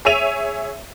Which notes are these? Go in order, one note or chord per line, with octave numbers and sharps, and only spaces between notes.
G#4 C#5 E5 D#7 F7